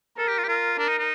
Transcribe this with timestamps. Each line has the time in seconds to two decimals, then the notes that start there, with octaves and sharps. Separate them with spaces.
0.18 A4 A#4
0.28 G4
0.38 F4
0.44 G4
0.48 F4 A#4
0.78 D4 A#4
0.88 D#4
0.99 D#4